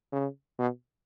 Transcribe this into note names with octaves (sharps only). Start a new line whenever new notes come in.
C#3
B2